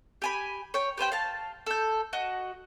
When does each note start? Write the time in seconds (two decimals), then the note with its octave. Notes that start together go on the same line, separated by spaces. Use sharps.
0.22 G4 G#5 B5
0.74 C#5 G5
0.97 G4 B4 C5 G5
1.12 F5 A5
1.66 A4 G6
2.13 F#4 D#5 F#5